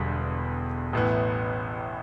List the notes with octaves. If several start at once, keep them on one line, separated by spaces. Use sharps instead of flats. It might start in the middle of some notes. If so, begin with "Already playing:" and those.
Already playing: E1 E2 D3 G3
A1 A2 E3 B3